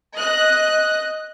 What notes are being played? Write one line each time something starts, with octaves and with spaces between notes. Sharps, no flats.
D#5 F#6